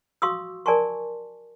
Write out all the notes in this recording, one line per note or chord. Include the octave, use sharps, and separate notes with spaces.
F#4 F5 C6 C#6 D#6 E6
A#4 D5 G#5 A5 C6 C#6